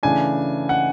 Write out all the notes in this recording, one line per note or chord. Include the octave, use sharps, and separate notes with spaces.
C#3 E3 A3 D4 G#5
F#5